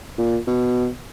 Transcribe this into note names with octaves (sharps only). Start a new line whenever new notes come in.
A#2
B2